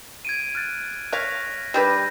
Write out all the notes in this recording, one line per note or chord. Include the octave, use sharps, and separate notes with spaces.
G#6 D7 D#7
F6 F#6 A6
C#5 F5 F#6 A#6 B6
G3 D4 B4 E6 G6 A#6